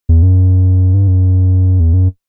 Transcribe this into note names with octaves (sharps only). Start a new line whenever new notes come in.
E2
F#2
G2
F#2
E2
F#2